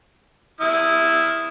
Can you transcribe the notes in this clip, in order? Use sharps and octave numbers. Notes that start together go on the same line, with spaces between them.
E4 D#6 F6